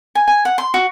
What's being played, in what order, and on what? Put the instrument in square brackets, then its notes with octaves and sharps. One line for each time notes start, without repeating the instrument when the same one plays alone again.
[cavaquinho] G#5
G#5
F#5
C6
F#4